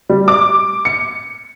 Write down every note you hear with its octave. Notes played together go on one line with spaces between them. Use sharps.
G3
D6
C#7